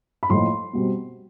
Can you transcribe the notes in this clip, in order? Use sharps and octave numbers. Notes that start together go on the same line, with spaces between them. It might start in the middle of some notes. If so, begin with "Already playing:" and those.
B5
A2 F3 A#3 D#4 C6
B2 G3 C4